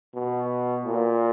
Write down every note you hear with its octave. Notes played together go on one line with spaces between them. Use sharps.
B2
A#2